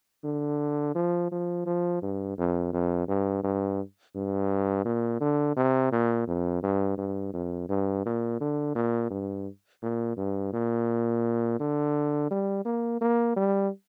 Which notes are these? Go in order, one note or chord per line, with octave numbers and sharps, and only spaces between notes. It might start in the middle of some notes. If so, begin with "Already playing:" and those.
D3
F3
F3
F3
G2
F2
F2
G2
G2
G2
A#2
D3
C3
A#2
F2
G2
G2
F2
G2
A#2
D3
A#2
G2
A#2
G2
A#2
D3
G3
A#3
A#3
G3